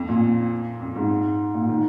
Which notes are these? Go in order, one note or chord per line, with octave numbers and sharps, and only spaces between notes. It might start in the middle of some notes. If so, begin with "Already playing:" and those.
Already playing: F2
A#2
F2
G#2
A#2
D#3